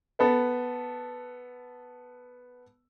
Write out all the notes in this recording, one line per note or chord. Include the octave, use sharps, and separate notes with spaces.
B3 A4 B4